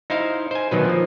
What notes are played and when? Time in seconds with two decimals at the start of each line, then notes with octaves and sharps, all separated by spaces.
0.10 D#4 E4 C5 F5
0.51 C5 G#5
0.71 B2 D#3 F#3 B4
0.85 F3 A#3